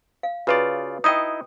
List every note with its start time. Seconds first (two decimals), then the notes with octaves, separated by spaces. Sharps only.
0.23 F5
0.47 C#3 F4 F#4 B4 D5 E5
1.04 D#4 E4 D#5 G5 D#6